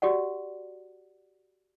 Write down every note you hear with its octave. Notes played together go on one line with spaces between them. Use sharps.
F#4 G4 D5 F#5